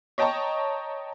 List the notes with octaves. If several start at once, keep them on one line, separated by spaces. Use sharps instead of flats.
C#5 D#5 G5 A5 A#5 C#6